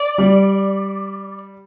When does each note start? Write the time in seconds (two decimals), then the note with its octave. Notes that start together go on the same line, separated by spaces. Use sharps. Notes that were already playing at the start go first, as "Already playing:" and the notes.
Already playing: D5
0.18 G3